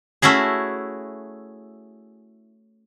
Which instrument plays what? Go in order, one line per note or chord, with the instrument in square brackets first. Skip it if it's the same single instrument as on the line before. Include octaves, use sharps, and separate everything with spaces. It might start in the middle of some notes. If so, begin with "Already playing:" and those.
[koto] A3 C#4 E4 F#4 G#4